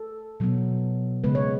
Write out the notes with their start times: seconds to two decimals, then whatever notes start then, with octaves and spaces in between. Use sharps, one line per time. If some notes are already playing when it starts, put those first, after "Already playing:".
Already playing: A4
0.40 B2 F#3 B3
1.24 C#3 G#3 B3 B4
1.35 C#5